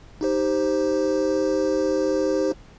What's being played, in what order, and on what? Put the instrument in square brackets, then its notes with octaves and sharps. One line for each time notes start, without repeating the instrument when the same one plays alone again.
[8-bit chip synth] D#4 G4 C5